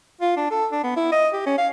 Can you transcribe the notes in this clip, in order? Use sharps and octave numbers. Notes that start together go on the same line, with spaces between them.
F4
D4
A4
D4
B3
E4
D#5
G4
C#4
F5